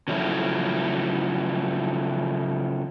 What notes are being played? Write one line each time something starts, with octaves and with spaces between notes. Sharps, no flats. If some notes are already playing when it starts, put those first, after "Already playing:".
C#3 F3 F#3 A3 E4